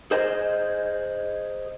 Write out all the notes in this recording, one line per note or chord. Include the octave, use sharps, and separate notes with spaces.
G#4 C5 D#5